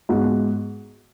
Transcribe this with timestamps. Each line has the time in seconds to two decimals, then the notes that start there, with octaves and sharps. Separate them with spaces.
0.09 G#2 G#3 B3 F#4